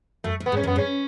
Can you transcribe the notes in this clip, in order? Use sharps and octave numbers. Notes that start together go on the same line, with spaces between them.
F#2 A3
A2
B3
G#2 C#4
F#2 B3
G#2
C#4